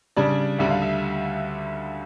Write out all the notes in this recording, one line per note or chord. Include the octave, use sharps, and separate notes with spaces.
C#3 G3 D4 D5
D2 D3 G3 E5
F5
E5